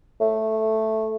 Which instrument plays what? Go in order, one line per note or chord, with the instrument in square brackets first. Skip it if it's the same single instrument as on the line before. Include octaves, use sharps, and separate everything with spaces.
[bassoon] A3